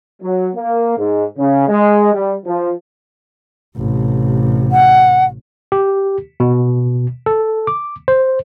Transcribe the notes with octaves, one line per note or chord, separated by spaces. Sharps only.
F#3
A#3
G#2
C#3
G#3
G3
F3
A1 C3
F#5
G4
B2
A4
D6
C5